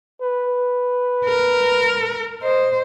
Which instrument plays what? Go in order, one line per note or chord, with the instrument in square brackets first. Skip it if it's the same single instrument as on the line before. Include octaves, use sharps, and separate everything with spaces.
[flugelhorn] B4
[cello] A#4
[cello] C5 [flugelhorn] D#5